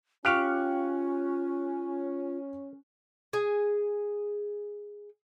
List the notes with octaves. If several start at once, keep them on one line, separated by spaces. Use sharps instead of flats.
C#4 F4 G4 F5 C#6 F6 F#6
G#4 G#5